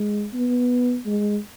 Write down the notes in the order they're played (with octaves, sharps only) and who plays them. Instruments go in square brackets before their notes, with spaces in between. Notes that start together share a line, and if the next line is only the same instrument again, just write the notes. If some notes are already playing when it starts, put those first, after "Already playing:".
Already playing: [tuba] G#3
B3
G#3